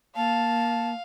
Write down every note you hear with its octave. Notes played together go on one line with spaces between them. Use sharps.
A#3 F5 A5